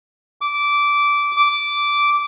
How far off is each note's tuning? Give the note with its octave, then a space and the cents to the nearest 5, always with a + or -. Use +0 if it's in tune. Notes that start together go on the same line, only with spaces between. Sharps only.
D6 -15
D6 -10